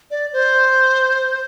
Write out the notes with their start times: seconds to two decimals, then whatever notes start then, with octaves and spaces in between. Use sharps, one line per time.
0.11 D5
0.33 C5